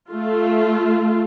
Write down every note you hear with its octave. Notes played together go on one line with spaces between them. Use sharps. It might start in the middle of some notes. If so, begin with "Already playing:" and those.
A3 F4